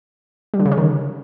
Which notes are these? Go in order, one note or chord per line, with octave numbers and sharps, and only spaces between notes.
G3
D3
C#3
C#4
D#3